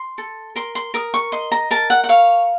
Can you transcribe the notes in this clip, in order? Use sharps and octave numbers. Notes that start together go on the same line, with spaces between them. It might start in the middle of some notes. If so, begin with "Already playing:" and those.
Already playing: C6
A4
A#4 C6
C6
A#4 D#6
C#6
D#5 C6
A#5
A#4 A5
F#5
F#5
C#5 F5